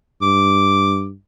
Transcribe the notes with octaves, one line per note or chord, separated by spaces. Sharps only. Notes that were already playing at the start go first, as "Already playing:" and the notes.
G2 D6